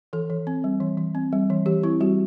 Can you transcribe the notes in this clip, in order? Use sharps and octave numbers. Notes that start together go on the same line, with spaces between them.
E3 A4
E3
C4
G3
E3
E3
C4
G3
E3
E3 G4
C4 E4
G3 F#4